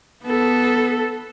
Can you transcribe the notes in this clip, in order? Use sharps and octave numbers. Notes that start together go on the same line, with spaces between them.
B3 A4